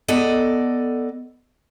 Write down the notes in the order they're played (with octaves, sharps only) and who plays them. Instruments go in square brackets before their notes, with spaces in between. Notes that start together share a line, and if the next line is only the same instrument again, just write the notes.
[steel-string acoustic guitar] B3 A4 D5 D#5